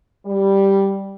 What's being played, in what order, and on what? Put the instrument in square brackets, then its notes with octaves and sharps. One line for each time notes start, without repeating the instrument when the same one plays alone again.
[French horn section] G3